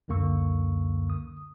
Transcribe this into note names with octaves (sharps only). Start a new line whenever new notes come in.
C#2 F#2 D3 A#3 C#6 E6
D#6